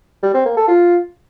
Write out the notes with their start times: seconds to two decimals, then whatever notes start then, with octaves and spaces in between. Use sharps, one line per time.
0.23 G3
0.34 C4
0.45 A#3
0.57 A4
0.68 F4